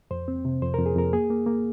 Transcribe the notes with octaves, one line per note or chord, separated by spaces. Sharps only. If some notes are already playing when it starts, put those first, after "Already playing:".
F2 C5
C4
C3
F2 C5
F2 A#4
G#4
F2 A#4
A#3 G#4
A#3
A#3